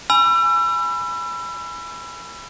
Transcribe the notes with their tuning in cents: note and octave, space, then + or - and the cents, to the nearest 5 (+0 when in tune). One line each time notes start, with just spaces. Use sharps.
G#5 +0 B5 +0 E6 +35